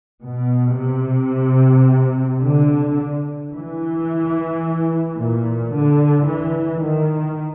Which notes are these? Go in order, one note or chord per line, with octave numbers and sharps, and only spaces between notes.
B2
C3
D3
E3
A#2
D3
E3
D#3